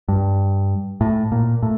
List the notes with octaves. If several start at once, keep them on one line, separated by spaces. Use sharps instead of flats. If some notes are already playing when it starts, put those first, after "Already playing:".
G2
A2
A#2
A2